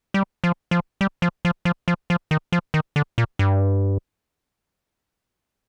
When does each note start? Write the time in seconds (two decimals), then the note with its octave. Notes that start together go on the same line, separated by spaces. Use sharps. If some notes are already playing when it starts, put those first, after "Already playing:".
0.14 G3
0.44 F3
0.71 F3
1.01 G3
1.22 F3
1.45 F3
1.65 F3
1.88 F3
2.10 F3
2.31 D#3
2.52 F3
2.74 D#3
2.96 D3
3.18 A#2
3.39 G2